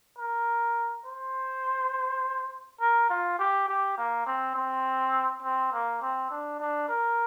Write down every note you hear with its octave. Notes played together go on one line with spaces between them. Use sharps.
A#4
C5
A#4
F4
G4
G4
A#3
C4
C4
C4
A#3
C4
D4
D4
A#4